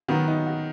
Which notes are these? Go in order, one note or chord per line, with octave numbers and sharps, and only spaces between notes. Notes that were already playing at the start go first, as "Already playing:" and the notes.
D#3 F#3 B3 F#4
D#4
F#4